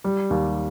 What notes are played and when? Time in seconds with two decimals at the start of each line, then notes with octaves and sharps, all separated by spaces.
0.04 G3
0.30 D#2